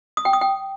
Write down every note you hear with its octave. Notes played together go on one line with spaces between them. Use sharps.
D#6
G5
D#6
G5